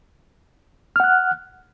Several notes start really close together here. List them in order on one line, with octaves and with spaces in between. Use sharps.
F6 F#5 F#6